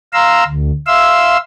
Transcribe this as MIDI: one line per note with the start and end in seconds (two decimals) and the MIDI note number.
0.13 0.44 77
0.13 0.44 82
0.13 0.44 84
0.13 0.44 88
0.48 0.71 38
0.87 1.37 76
0.87 1.37 77
0.87 1.37 84
0.87 1.37 88